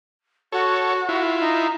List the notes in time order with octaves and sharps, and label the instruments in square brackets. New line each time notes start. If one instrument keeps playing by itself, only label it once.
[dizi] F#4 [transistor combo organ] A4 C#5
[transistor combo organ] E4 F4
[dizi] D#4